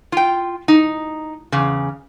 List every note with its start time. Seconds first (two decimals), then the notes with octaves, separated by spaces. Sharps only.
0.12 F4 G5
0.68 D#4
1.52 E2 C#3